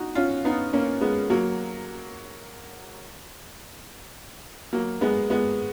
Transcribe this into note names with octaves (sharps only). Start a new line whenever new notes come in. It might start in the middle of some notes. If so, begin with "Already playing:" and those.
Already playing: D#4 F#4
C#4 F4
B3 D#4
A#3 C#4
G#3 B3
F#3 A#3
F#3 A#3
G#3 B3
G#3 B3